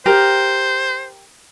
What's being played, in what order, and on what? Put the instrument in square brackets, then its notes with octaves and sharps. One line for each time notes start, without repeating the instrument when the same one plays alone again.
[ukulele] G4 A#4 [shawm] C5